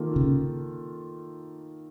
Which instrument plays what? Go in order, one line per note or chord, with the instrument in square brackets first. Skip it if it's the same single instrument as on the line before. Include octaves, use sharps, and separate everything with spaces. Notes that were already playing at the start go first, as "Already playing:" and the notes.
Already playing: [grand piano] D#3 A#3 F4 A4
[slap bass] C#3